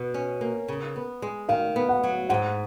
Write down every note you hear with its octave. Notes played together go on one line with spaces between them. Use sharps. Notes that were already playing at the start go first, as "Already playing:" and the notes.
Already playing: B2
C#4
A#3
C#3
B3
G#3
D#3 F5
B3
F#5
F#3
G#2 F#5